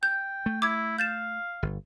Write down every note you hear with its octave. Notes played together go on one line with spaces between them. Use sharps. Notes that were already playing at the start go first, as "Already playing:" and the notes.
G5 G6
A3
E4 D6 G#6
F5 G6 A6 E7
G1